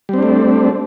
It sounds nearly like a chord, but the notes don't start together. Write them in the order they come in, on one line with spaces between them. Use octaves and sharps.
G3 C4 D4 A3